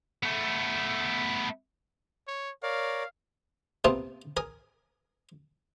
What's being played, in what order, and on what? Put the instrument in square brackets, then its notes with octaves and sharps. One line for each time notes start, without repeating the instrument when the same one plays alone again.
[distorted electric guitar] A3 B3
[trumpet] C#5
[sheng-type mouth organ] A#4 C#5 D5 [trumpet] F5
[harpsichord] C3 A#3 B3 F4 A5 D#6
A#4 G#5 D#6